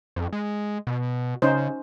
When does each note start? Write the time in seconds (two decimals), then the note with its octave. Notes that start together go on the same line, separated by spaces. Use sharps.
0.16 F2
0.33 G#3
0.87 B2
1.42 C#3 C#4 D#4 C5